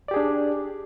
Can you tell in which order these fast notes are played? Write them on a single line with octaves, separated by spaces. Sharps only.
D5 G4 G#4 D4